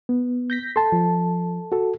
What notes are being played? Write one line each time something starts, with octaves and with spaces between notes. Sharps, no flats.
B3
G6 A#6 B6
A4 A5 C6
F3
F#4 A4